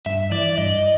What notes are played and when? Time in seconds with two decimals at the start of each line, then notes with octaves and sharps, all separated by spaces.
0.06 G2 E5
0.32 E3 D5
0.58 G2 D#5